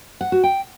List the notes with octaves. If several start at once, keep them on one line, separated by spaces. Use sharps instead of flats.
F#5
F#4
G5